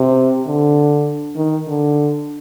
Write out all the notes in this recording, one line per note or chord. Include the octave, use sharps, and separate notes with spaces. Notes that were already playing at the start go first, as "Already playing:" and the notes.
Already playing: C3
D3
D#3
D3